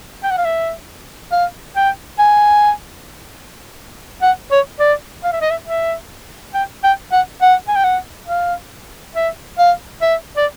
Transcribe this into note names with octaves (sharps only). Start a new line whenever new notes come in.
G5
F#5
F5
E5
F5
G5
G#5
F#5
C#5
D5
F5
E5
D#5
E5
E5
G5
G5
F#5
F#5
G#5
G5
F#5
F5
E5
F5
E5
D5